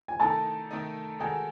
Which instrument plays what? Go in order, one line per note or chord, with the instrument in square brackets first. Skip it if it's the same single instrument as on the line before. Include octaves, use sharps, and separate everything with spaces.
[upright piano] G#5
[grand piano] D#3 A3 D#4 A4 D#5 [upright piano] A5
[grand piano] D#3 A3 D#4 A4 D#5
[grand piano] D#3 G#3 D#4 F#4 A4 [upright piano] G#5